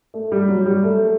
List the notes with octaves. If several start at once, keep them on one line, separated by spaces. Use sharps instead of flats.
A3
G3
F#3
G3
A3